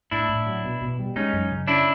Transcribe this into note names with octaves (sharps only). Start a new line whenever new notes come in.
A2 D4 E4
A2
F#3
B2
B2
G3
G#3 C#4 D#4
F#2
C#3
C#4 D4 E4